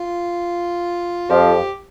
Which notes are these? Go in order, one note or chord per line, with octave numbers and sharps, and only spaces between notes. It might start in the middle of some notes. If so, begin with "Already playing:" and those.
Already playing: F4
F2 F3 G4